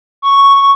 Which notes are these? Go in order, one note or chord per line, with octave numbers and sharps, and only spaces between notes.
C#6